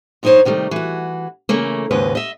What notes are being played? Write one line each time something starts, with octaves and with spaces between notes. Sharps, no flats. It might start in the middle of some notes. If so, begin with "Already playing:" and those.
G2 F3 D#4 F#4 C5 C#5
C3 D#3 G3 A3
E3 F#4
C#3 E3 A3 A#3
D#2 G#2 C#3 B4 D#5
D#5 E5